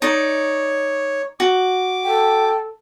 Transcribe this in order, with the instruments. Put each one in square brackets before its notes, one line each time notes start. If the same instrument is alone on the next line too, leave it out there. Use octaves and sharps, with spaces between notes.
[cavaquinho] D#4 D5 [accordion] C#5
[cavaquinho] F#4 [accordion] D6
[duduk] A4 [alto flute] G5